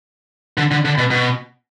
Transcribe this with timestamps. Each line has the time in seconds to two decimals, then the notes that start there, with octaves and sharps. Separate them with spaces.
0.58 D3
0.71 D3
0.85 D3
0.98 B2
1.11 B2